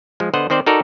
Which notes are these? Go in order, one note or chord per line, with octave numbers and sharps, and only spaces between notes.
F3 G#3
D3 B3 C5 D#5 F#5
D#3 C4 C5 D5
D#4 F#4 A4 A#4 D5